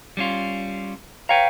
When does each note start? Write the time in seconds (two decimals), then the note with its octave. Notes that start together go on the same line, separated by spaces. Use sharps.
0.17 G3 C#4 F4
1.29 B4 C#5 F5 G5 A#5